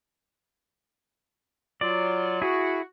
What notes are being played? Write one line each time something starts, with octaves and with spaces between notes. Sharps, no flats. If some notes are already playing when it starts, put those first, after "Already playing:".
F#3 F4 D5
E4 F#4 G#4